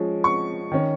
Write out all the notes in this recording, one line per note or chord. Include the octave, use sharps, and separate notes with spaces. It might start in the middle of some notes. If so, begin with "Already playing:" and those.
Already playing: F3 G#3 C#4
C#6
D#3 C#4